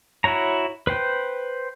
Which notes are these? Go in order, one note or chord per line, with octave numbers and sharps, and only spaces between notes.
E4 F#4 C#5 A#5
B4 C5 G5